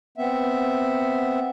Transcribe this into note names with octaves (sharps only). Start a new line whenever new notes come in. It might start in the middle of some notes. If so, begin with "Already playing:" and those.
B3 C4 E5